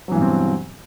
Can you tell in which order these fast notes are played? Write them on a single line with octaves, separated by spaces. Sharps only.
F#3 E3 G2 B2 C4